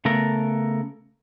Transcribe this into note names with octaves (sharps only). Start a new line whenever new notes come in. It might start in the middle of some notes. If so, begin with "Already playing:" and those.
C#3 A3 B3 A4 A#4